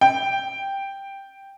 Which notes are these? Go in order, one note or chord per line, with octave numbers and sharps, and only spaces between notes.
G5